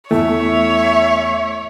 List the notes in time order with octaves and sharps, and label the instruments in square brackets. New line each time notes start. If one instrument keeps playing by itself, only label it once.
[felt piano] E2 [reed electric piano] A3 [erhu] C#5 [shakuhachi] E5